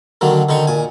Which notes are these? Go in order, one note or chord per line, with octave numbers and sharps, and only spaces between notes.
D3 D#3 F#3 A#3
D3 D#3 D#4 C#6
A#2 G#5